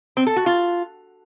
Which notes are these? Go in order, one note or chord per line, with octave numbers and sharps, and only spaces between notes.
C4
A4
F#4
F4